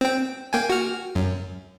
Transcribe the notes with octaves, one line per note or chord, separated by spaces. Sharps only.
C4 G5
A#3 G5 G#5
F#4 F6
F#2